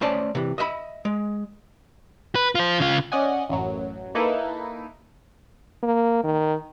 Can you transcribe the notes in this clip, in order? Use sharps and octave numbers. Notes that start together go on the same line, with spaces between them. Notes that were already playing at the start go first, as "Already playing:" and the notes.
A3 C#4 C5 D5 A5
C3 E3
D#5 E5 G5 B5
G#3
B4
F4 C5
C#3 F4
C#4 D5 D#5 F#5 G#5
A1 F#2 F#3
A#3 D#4 E4 A4 B4
A#3
D#3